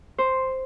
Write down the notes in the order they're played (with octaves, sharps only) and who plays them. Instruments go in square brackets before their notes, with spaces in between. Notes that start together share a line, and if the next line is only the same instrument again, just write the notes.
[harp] C5